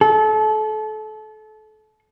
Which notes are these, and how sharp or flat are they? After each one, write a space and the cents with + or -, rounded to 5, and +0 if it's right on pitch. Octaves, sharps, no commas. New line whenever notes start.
A4 -30